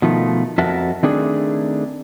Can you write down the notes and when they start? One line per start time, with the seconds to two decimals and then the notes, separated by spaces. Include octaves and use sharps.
0.02 B2 D#3 F3 A3
0.58 F2 F#4 A#4 E5 A5
1.03 D#3 A3 C4 D4 G#4